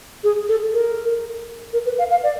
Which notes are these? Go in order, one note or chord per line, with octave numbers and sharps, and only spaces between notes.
G#4
A4
A#4
A#4
B4
F5
F5
D5